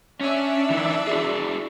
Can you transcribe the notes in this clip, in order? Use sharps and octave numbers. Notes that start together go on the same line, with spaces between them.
C#4 D4 D5 E5
E3 D#4
E4 F#4 G#4